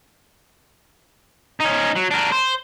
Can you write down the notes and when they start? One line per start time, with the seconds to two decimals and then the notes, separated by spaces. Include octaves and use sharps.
1.60 C#4 D#4
1.96 F#3
2.11 D4 A#4
2.32 C5